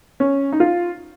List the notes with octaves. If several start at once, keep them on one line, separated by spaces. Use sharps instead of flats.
C#4
D#4
F4